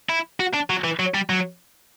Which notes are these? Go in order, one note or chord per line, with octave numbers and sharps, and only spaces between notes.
E4
F#4
D4
F#3
E3
F#3
G3
F#3